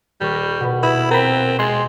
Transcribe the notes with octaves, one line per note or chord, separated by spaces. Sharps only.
D#1 G3 A#4 C#6
B2 B3
E4 B4
C4 A#4 B5
G#3 C6 A6